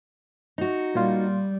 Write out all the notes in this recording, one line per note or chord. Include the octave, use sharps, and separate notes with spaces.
D#4 F#4
A#2 G3 F4